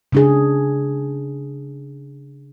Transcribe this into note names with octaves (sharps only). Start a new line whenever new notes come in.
C#3 D4 G#4